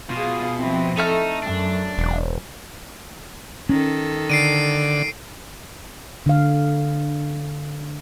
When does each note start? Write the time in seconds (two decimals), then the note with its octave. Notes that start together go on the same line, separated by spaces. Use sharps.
0.10 B2 F4 G#4
0.57 F3 C4 E4
0.97 A3 D#4 E5 F6
1.43 F#2 D4
1.98 E1
3.69 D#3 C#4 A4
4.30 D3 C7 D7 D#7
6.26 D3 F5